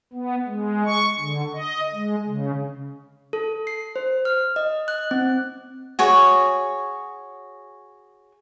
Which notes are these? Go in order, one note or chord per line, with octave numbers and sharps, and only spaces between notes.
B3
G#3
C#6
D3
D#5
G#3
C#3
A4
C7
C5
F6
D#5
F#6
C4
F#4 G#4 C#5